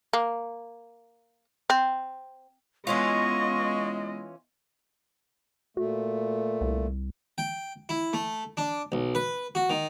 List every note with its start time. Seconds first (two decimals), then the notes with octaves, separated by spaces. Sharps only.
0.13 A#3
1.70 C4
2.87 E3 G#3 B3 C#4 F4 D#5 C#6
5.77 A#2 A3 F#4
6.61 C2
7.38 G5
7.89 E4
8.13 A3
8.57 D4
8.92 B1
9.15 B4
9.55 F#4
9.70 D#3